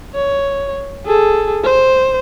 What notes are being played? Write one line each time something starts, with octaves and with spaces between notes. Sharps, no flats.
C#5
G#4 A4
C5